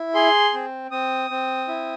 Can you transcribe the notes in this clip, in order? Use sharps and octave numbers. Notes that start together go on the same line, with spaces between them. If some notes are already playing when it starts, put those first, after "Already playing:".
Already playing: E4
G#4 C6
C4
C4 D#6
C4
E4